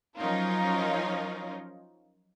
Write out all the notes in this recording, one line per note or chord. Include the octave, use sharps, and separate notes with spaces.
F3 F#3 C#4 D#4 F4 A#4